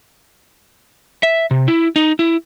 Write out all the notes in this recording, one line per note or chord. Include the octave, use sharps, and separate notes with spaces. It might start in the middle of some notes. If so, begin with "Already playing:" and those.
E5
C3
E4
D#4
E4